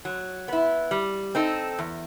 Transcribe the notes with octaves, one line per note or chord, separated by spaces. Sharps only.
F#3
B3 E4
G3
C4 D#4 A4
E2